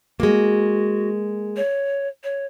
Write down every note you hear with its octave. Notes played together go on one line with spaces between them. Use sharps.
G#3 A#3 F#4
C#5
C#5